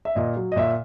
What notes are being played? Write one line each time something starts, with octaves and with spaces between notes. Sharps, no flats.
E5
A#2 D#5
F#3
D#5
A#2 E5